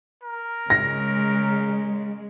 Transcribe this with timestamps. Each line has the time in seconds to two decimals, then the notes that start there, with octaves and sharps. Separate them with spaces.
0.23 A#4
0.70 C#3 G#3 A#6